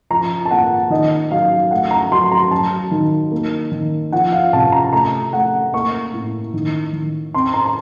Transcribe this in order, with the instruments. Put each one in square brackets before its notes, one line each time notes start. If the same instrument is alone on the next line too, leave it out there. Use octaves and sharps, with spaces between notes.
[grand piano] F3 A#5
A5
A#3 F#5
D#3 D#5
F#3 F5
A3 F#5
A#5
F#3 C6
A#5
F#3 A5
D#3
A#3
D#3
F3 F#5
F5
C3 A5
A#5
A3 A#5
A3 F#5
A#3 C#6
A2
D#3
D#3
C4 C6
A#5
A#5